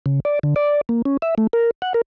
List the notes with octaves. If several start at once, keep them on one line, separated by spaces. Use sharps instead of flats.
C#3
D5
D3
D5
A#3
C#4
E5
A3
A#4
F#5
A#4